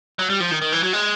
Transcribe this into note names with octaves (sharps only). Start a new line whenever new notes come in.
F#3
G3
F3
D#3
D#3
E3
F#3
G#3